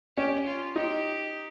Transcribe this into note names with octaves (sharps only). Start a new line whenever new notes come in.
C#4 G4
F4
D#4 G4